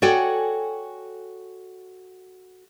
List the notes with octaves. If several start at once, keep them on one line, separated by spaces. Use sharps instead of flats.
F#4 A4 C#5 D5 G5 G#5